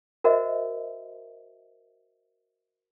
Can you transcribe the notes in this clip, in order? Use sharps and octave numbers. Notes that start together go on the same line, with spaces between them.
F#4 A#4 C5 D#5 E5